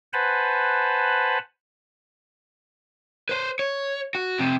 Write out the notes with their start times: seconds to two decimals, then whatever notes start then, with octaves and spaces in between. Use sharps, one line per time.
0.13 B4 C5 F#5 G#5 A5 B5
3.29 B4 C5
3.59 C#5
4.15 F#4
4.39 F2 C3